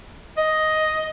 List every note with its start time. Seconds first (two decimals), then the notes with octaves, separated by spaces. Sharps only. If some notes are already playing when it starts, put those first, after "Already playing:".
0.38 D#5